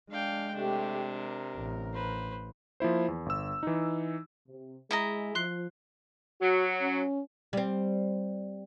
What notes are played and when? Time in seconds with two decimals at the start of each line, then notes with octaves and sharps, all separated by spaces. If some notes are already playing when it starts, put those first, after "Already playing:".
0.11 G#3 D4 F5 G5
0.55 C3 A3 D4 G4
1.14 A#4
1.57 A1
1.93 B4 C5
2.80 F3 A#3 E4 C5
3.08 E2
3.26 G1 E6
3.63 E3 D#4
4.48 C3
4.91 G#3 E4 G#4 D#5 A#5
5.35 F3 C6 F#6 C7
6.41 F#3 F#4
6.81 C#4
7.53 G3 C4